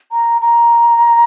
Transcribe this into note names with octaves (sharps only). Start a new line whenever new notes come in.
A#5
A#5